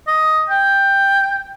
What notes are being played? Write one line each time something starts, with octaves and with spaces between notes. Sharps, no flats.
D#5
G5